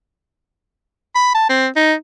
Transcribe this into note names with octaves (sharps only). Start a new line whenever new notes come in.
B5
A5
C4
D#4